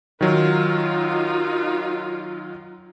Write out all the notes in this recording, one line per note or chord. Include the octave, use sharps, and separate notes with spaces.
D#3 F#3 D#4 F4